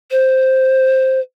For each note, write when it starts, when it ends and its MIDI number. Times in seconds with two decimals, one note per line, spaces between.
0.11 1.20 72